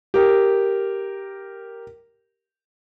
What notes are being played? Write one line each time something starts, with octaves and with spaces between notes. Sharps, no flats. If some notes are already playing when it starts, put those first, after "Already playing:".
G4 A#4